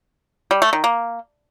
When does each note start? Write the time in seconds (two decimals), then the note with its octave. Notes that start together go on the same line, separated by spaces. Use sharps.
0.51 G3
0.62 A3
0.73 D#3
0.84 A#3